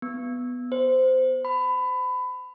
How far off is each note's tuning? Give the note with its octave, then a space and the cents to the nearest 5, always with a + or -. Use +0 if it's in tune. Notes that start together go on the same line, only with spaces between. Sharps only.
B3 +5
C5 -15
B5 +25